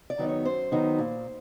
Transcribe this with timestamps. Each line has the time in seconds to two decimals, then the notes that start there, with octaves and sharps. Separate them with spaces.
0.10 D5
0.19 D#3 F#3 B3 D#4
0.28 C#5
0.45 F#2 C5
0.72 D#3 F#3 B3 D#4
0.99 A#2